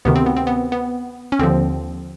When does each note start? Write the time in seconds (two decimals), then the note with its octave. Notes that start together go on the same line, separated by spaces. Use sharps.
0.05 D2 C3 D#3 B3
0.15 C4
0.26 B3
0.37 C4
0.47 B3
0.72 B3
1.32 C#4
1.39 D#2 D3 F3 C4